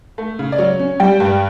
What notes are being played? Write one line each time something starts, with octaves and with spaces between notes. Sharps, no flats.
A3
C#3
D5
F#3 C#5
C#4
G3 G5
G2